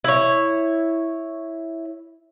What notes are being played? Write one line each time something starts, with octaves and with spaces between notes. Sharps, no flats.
E4 C#5